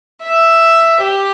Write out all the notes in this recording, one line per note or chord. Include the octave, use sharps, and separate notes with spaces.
E5
G4